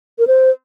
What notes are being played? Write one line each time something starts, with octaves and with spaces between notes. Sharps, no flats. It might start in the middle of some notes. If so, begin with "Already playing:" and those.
A#4
C5